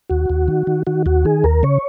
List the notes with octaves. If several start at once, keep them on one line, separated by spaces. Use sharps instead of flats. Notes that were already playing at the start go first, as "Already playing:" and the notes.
D#2 F#4
D#2
D#3
D#3
D#3 F#4
D#2 F#4
D#3 G#4
D#2 A#4
C#3 C#5